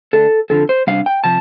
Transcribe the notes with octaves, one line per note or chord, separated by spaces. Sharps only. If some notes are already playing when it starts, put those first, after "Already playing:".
D3 A3 D4 A4
F2 D3 F3 A4
C5
C3 G3 D4 F5
G5
C3 F3 A5